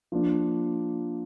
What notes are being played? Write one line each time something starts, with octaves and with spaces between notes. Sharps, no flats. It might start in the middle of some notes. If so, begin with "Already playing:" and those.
F3 A#3 D4